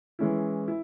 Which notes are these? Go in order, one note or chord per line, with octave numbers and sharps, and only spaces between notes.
E3 G#3 C#4 E4
E4